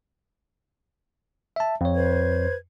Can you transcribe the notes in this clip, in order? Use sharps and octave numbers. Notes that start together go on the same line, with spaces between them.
E5 A5
F2 C#5
B4 C5 G#6